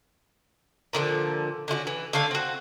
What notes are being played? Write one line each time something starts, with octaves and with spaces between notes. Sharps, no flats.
A#2 D3 E3 F3
D3 C#4 F4 F#4
E3
D3 A3 F5 G#5
C4 F#4